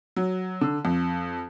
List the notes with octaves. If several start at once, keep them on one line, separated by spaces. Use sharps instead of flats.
F#3
D3
F2